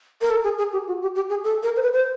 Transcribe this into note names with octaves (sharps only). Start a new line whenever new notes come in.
A#4
A4
G#4
G#4
G4
F#4
G4
G4
G#4
A4
A#4
C5
B4
C5